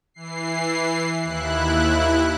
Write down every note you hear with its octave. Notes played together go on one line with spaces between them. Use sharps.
E3 C7
D#2 E4 F#6